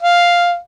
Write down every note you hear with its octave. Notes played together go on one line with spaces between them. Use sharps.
F5